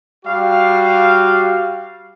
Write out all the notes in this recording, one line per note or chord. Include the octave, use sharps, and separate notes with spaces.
G3 F#4 F5